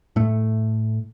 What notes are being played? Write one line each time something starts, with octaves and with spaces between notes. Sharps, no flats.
A2 A3